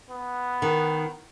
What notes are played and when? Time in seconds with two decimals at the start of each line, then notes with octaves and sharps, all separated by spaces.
0.10 B3
0.62 D#3